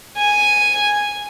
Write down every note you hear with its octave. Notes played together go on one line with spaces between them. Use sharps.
G#5